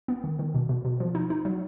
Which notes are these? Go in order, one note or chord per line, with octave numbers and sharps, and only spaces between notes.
B3
D#3
D#3
B2
B2
B2
F3
D#4
D#4
F#3